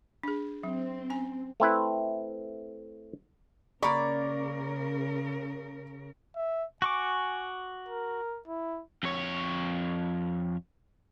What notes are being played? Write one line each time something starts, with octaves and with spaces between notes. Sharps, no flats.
D4 G#4
F#3 C4
C#4 G#5
A3 C4 E4 B4
C#3 A#3 A#4 D5 A#5 B5 C#6
E5
F#4 G#5 C#6 D6
A#4
E4
F2 C#5